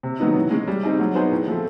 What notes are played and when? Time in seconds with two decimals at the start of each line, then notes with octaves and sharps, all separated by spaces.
0.03 C3
0.20 D#3 F#3 B3 D#4
0.36 E3
0.51 G#3 C#4
0.67 G3
0.83 C4 D#4 G#4
0.99 F#3
1.15 B3 D#4 G#4 C5
1.31 A2
1.47 F3 A3